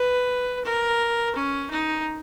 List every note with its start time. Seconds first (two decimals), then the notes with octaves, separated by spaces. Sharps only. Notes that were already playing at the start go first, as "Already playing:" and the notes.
Already playing: B4
0.64 A#4
1.35 C#4
1.70 D#4